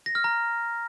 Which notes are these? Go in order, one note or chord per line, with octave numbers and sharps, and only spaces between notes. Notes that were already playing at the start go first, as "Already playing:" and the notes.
A#6
F6
A#5